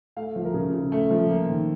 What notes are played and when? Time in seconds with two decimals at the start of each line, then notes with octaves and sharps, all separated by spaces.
0.16 A3 F5
0.36 F3
0.45 A#4
0.54 C#3
0.73 C#3
0.92 A3
1.10 F3
1.30 A#3
1.49 D#3